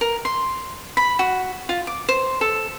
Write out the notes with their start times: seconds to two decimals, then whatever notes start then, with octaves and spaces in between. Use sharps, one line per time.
0.01 A#4
0.25 C6
0.97 B5
1.19 F#4
1.69 F4
1.87 D6
2.09 C5
2.41 A4